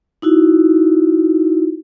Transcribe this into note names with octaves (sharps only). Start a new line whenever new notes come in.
D#4 E4 F#4